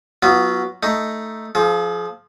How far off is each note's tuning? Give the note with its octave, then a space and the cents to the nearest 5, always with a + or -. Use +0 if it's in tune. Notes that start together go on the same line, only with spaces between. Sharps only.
F#3 +0 B3 -5 F4 -25
A3 +0 D#4 +0
F3 +0 G#4 +40